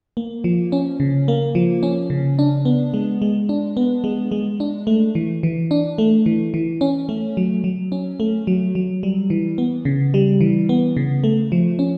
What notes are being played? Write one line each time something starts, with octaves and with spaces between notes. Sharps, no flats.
A#3
F3
C#4
C#3
A#3
F3
C#4
C#3
D4
B3
G#3
G#3
D4
B3
G#3
G#3
D4
A3
E3
E3
D4
A3
E3
E3
C#4
A3
F#3
F#3
C#4
A3
F#3
F#3
G3
E3
B3
C#3
G3
E3
B3
C#3
A3
F3
C#4